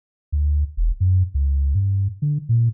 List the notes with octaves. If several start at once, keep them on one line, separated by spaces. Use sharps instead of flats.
D2
E1
F#2
C#2
G2
D3
A#2